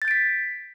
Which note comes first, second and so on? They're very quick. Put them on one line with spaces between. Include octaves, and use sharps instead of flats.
A6 G6 D7 B6